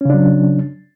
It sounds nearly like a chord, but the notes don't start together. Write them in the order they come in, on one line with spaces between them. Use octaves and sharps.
C#4 C#3 D4 F#3